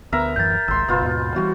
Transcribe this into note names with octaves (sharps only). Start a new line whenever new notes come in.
D2 B3 A#4 E5 A#5
D1 F#2 E3 G6 A6
G#1 C#2 C6 E6
F#1 B2 B3 F4
D#2 G#2 B2
E3 F#3 G3 F#4